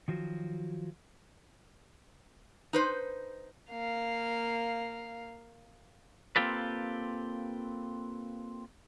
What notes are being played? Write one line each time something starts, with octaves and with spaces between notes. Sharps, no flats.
D#3 F3 F#3 F#4
D#4 B4 C5
A#3 F5
A#3 C4 F4 G4 A4 B4